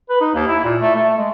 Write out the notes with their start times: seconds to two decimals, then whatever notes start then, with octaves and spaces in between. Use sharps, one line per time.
0.09 B4
0.21 D#4
0.35 D#2
0.48 E4
0.64 A#2
0.81 A3
0.95 A3
1.17 G#3